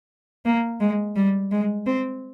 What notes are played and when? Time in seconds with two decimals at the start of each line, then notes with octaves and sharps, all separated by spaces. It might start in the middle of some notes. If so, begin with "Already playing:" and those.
0.46 A#3
0.81 G#3
1.16 G3
1.52 G#3
1.87 C4